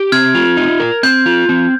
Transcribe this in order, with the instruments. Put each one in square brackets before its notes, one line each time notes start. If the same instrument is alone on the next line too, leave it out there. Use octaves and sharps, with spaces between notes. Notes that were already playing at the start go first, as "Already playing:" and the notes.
Already playing: [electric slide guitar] G4
[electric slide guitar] C4 [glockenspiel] F6 G#6
[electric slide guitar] F4
D#4
A#4
[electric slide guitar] C4 [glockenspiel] G6
[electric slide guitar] F4
C4